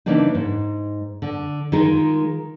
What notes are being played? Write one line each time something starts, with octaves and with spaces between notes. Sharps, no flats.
C#3 E3 A#3 D4 D#4
G#2
D3
D#3 G#3 D#4 F4 A#4